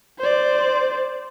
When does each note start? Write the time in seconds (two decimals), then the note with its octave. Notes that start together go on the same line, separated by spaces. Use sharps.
0.19 C5 D5